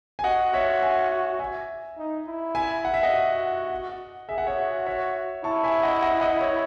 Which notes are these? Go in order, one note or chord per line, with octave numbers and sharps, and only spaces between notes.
G#5
F#4 D#5 F#5
C#5 E5
E5 G#5
E5 G#5
D#4
E4
E5 G#5
F#5
E5
D#5 F#5
F#4
G#4 E5
F#5
C#5 E5
F#4
C#5 E5
E4 A5 C#6
E5 G#5
D#5 F#5
D#5 F#5
D#5 F#5
C#5